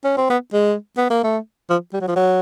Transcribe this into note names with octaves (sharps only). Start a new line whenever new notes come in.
C#4
C4
B3
G#3
B3
A#3
A3
F3
G3
F#3
F3
F#3